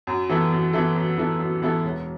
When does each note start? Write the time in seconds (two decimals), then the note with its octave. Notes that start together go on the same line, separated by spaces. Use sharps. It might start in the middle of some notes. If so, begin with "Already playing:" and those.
0.07 F#2
0.29 E3 B3 E4 A4
0.52 F#2
0.73 E3 B3 E4 A4
0.96 F#2
1.18 E3 B3 E4 A4
1.40 F#2
1.62 E3 B3 E4 A4
1.84 E1